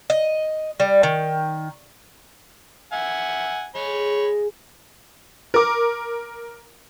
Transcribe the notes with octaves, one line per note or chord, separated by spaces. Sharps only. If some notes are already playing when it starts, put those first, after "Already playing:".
D#5
G3
D#3
E5 F#5 G#5
G#3 C#5 B5
A#4 D6